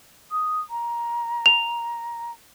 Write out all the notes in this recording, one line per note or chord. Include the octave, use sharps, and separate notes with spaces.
D#6
A#5
F7